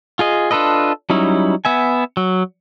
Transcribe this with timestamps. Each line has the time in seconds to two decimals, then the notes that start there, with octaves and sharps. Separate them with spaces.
0.19 F4 G#4 D#5
0.51 D4 F4 A4 B4 D#5
1.10 F#3 G3 C#4 D#4 E4
1.65 B3 E5 G#5
2.17 F#3